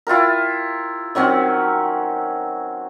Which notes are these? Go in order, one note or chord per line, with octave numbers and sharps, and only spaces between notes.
E4 F4 G4 A#4
D#3 F#3 C4 C#4